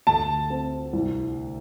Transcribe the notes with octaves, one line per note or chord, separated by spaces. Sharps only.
D2 A5
C4
C2